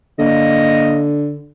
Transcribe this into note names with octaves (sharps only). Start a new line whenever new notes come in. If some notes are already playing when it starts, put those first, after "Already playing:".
D3 A#3 D#5